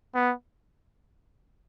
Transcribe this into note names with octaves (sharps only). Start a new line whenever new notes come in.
B3